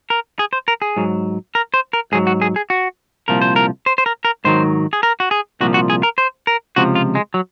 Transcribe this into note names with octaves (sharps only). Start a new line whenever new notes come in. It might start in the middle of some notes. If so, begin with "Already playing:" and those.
A#4
G#4
C5
A#4
G#4
G#2 F#3
A#4
C5
A#4
G#2 F#3 G#4
F#4
G#4
G#4
F#4
C2 A#2 F3 A#4
C5
A#4
C5
C5
A#4
A#4
G#2 D#3 F#3 C5
G#4
A#4
F#4
G#4
C2 A#2 F3 F#4
F#4
G#4
A#4
C5
A#4
C#2 C3 F3 F#4
F4
G#3
F#3